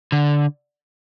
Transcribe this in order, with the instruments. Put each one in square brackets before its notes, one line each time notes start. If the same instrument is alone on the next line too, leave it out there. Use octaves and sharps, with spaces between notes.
[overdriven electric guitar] D3